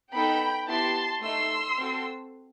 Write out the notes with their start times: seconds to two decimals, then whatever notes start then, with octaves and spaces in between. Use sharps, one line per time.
0.13 B3 D#4 A4 G5 B5
0.68 B3 E4 G4 A5 C6
1.22 A3 D#4 A4 C6 E6
1.77 C4 F#4 A4